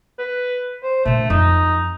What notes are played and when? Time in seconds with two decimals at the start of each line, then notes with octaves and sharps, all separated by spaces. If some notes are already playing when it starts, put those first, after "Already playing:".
0.19 B4
0.84 C5
1.05 A#2 D3 A3
1.30 F2 D#4